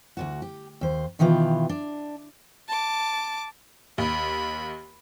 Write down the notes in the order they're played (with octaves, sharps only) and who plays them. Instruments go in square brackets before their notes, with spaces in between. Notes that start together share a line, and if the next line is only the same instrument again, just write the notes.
[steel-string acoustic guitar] D2 G#2 F#4
G4
D#2 C5
B2 D#3 E3 F4 G4 B4
D4
[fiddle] A5 D6
[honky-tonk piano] D#2 [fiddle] B5